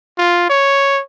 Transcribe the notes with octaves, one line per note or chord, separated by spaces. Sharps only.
F4
C#5